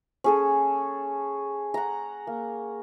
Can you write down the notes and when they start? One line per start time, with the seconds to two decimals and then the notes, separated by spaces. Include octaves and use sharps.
0.24 C#4 G#4 A4
1.74 F#5 A#5
2.27 A#3